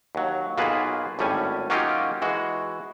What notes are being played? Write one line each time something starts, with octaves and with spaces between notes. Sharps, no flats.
D#2 F#3
B1 A#3 F4 F#4 G#4 B4
G#1 A2 G3 C#4 G#5
F#3 A#3 C#4 D#4 F4 G4
E3 G#3 F#4